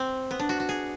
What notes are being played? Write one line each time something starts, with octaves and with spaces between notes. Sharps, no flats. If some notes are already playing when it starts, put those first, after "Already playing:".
Already playing: C4
B3
D4
F#4
F#4
G#4